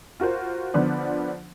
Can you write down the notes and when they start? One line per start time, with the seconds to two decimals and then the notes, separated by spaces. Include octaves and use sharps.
0.20 F4 F#4 A#4 C5
0.74 D3 F3 B3 D4 C5